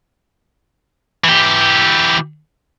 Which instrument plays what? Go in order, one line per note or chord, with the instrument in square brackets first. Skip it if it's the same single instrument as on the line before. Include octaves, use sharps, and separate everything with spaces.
[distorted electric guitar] E3 G4